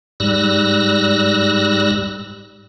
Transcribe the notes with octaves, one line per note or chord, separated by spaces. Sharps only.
G#2 G3 E6 F#6 A#6